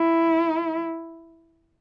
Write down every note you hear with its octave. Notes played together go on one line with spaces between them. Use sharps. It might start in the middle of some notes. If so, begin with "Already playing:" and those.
Already playing: E4